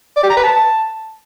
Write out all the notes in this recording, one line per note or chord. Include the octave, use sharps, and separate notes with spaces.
D5
G4
A#5
B4
A5